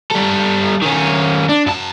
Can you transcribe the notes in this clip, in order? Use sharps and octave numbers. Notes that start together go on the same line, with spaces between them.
G3 A4
D#3 C#4
D4
F#2 A5